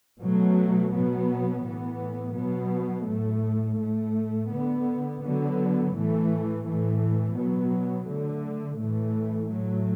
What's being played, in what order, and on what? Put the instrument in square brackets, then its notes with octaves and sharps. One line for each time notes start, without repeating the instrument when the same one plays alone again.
[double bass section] B2 F#3 A3
B2 F#3 B3
A2 E3 B3
B2 F#3 B3
A2 A3
A2 A3
D3 B3
D3 F#3 B3
A2 E3 A3
A2 E3 A3
B2 F#3 B3
D3 A3
A2 E3 A3
A2 F#3 A3